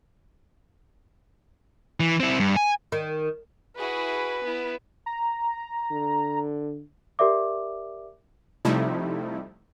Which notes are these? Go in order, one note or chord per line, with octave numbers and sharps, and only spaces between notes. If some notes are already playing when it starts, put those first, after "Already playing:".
E3
C4 E4
G2
G#5
D#3
E4 F#4 G#4 B4
B3 E4
A#5
D3
G4 A#4 D5 E5 D6
C3 F3 G3 A3 D#4 E4